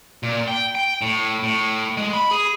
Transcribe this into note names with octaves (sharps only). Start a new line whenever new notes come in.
A#2
G5
G5
A2
A2
G#3
B5
G#4